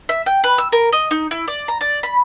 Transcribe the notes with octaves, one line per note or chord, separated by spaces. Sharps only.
E5
G5
B4
E6
A#4
D#5
D#4
E4
D5
A#5
D5
B5